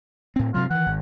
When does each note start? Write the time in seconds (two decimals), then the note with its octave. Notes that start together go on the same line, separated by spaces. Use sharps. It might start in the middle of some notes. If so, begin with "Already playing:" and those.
0.36 A2 C4
0.54 G2 C3 F#3 F4
0.70 D#3 E3 F#5
0.86 G#1